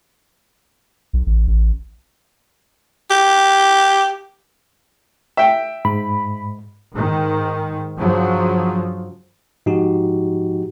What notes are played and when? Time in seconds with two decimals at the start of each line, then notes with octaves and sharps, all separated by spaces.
1.13 B1
1.26 A1
1.47 A1
3.11 G4
5.37 E5 G5
5.85 G#2 B5
6.95 G#2 D#3
7.97 G2 C#3 F3 F#3
9.66 G#2 F3 D#4 F#4 G4